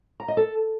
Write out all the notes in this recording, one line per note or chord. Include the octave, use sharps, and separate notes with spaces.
A#5
D#5
A4